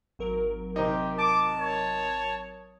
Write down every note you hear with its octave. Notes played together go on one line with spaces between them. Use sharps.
G#1 F#3 A#4
C3 C4 D#4 G4
A5 D6
C#5